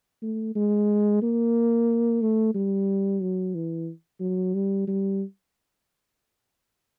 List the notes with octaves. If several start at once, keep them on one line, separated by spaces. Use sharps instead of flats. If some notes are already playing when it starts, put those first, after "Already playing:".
A3
G#3
A#3
A3
G3
F#3
E3
F#3
G3
G3